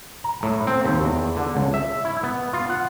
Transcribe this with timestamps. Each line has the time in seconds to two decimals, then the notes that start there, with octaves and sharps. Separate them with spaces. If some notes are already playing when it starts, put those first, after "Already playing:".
0.24 A#5
0.43 A2
0.67 C4
0.84 D#2
1.04 E2
1.36 D3
1.55 C#2
1.74 E5
2.05 E4
2.23 B3
2.53 F4
2.70 F#5